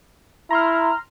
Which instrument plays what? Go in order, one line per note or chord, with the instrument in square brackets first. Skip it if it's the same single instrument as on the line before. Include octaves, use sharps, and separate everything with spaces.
[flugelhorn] E4 [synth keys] A#5 C6 F6